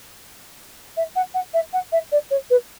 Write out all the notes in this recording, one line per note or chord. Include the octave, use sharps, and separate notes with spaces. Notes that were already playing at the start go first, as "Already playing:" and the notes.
E5
F#5
F#5
E5
F#5
E5
D5
C#5
B4